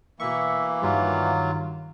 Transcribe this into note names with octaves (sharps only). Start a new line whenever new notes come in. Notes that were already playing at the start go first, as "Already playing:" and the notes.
B2 E3 A#3 E5 C#6
G2 D#3 F#3 G3 F4